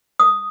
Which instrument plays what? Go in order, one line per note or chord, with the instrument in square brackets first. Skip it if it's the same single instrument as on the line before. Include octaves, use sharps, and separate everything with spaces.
[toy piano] D#6